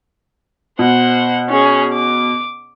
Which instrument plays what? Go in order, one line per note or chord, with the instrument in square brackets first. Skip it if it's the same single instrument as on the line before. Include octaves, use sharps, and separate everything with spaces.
[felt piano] B2 [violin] C5 F#5
[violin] C#4 G#4
D6